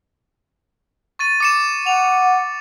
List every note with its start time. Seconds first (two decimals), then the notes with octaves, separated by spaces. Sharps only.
1.19 C#6 A6 D#7
1.40 D6 C#7 E7
1.86 F#5 F7